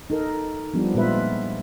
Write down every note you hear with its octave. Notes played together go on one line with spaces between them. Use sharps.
D#4 A4 A#4
F3 G3 B3 D4
A#2 G#3 B3 F4 B4 E5